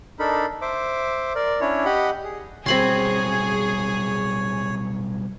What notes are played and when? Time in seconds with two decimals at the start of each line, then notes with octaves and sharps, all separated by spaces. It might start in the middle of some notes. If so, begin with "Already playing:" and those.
0.19 D4 D#4 A4 A#4 B5
0.62 C5 E5 D6
1.35 A#4 D5
1.61 C#4 D4 E4 C#5
1.85 G4 D#5 F#5 B5
2.24 G#4
2.66 B2 F#3 G3 C4 G#4 C#5 B5 C6